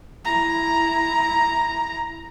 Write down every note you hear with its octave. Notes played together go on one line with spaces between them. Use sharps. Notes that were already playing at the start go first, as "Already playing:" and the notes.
E4 A#5